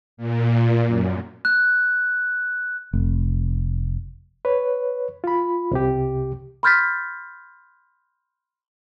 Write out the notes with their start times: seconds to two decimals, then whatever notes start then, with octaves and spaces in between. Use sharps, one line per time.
0.17 A#2
0.87 F#2
1.45 F#6
2.93 F1
4.45 B4 C#5
5.24 F4 B5
5.71 C2 C3 G4
6.63 B5 C6 F6 G6 A6 B6